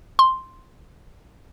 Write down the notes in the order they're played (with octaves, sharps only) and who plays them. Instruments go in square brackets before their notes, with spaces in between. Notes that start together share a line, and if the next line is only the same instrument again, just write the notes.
[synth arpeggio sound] C6